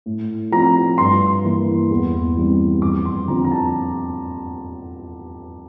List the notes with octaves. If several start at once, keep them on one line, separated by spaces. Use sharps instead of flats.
A2
F3 C4 A#5
G2 C6
E3 A#3
E2
E3 G3 C4
F2 D6
C6
D3 F3 C4 A#5
A#5
A5